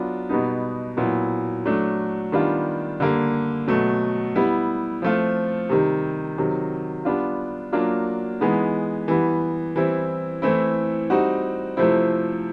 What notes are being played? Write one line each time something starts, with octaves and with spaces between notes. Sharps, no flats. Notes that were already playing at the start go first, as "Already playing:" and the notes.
Already playing: F#3 B3 D4 F4
B2 G3 B3 D#4
A#2 F#3 B3 E4
F#3 A3 D4
D#3 G3 B3 D4 F4
D3 G3 A#3
B2 F#3 A3
G3 B3 E4
F3 A3 C4 F4
C3 D#3 G3
C3 D#3 F#3
G3 B3 D4 F4
F#3 A#3 D4 F4
E3 G#3 B3 D#4
E3 G3 B3
E3 G3 C4 E4
E3 A3 C4 E4
G3 C4 D#4 F#4
C3 F3 A3 C4 E4